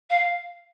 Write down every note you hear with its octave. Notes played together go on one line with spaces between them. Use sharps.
F5